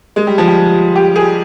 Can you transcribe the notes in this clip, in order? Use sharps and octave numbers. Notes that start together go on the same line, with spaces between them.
G#3
G3
F3
G3
G4
G#4